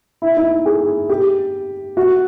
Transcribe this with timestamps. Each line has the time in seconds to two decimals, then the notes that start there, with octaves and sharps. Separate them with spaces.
0.22 E4
0.37 D#4
0.66 G#4
1.09 G4
1.97 F#4